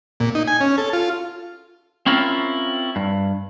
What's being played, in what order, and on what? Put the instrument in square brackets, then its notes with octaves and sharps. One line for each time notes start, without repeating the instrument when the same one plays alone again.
[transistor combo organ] A#2
D#4
G#5
C#4
A4
F4
[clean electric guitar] C4 C#4 E4 F4 A#4
G2